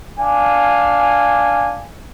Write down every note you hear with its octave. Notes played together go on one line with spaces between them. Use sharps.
D4 F5 G#5